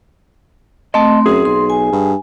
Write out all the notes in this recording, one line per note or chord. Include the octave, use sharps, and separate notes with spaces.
A3 C4 D#5 A5 C6
F#2 C4 G#4
B1 C6
G#5
G2